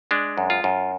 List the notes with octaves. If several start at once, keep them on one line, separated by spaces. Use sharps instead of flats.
G#3 D4
F#2
F4
F#2